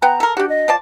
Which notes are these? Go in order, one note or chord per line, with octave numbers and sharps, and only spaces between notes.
B3 F#5 G5 A#5
A4 A#4
D4 F#4 G4
D#5
F3 D5 A5